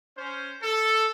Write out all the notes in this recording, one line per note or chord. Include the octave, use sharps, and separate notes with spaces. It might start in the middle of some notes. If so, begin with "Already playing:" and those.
C#4 C5
A4